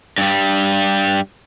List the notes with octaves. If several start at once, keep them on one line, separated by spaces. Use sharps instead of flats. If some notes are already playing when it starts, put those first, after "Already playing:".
G2 G3